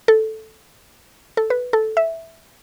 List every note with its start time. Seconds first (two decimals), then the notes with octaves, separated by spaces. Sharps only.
0.08 A4
1.37 A4
1.50 B4
1.73 A4
1.97 E5